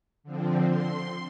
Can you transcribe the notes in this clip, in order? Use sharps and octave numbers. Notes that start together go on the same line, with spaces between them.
D3 F3 C4
C6